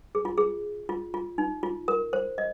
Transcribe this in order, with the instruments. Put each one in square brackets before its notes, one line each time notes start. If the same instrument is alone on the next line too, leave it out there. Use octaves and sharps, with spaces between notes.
[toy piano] G#4
F4
G#4
F4
F4
D#4
F4
A#4
C5
D#5